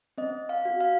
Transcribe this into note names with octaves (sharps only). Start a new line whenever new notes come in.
C4 D#5
F5
F#4
F5